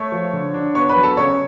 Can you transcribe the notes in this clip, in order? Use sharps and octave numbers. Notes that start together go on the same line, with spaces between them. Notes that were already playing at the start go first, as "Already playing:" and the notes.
Already playing: A3 C#5 C#6
F3
D3
D4
B3 C#5 C#6
B4 B5
F#3
A4 A5
C#3 C#5 C#6